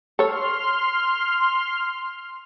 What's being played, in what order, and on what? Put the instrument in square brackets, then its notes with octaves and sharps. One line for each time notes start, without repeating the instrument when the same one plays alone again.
[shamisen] A4 C#5 [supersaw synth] C6 F6